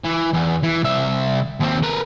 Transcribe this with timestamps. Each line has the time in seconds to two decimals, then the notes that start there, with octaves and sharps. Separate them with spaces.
0.05 E3
0.33 E2
0.63 E3
0.83 C2 E5
1.60 D#2 C4
1.83 A#4 B4